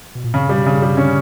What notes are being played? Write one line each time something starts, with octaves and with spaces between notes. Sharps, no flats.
B2
A#2
G2 C#3
G3
B2
C#3
G2
G3
D3 C#4